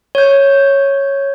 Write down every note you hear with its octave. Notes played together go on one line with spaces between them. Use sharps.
C#5 G6